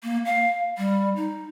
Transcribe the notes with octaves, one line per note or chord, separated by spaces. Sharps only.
A#3
F5
G3
D#4